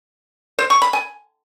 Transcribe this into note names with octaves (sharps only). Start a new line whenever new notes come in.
C5
C#6
B5
G#5